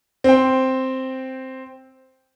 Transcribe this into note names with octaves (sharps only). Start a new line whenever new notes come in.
C4 G5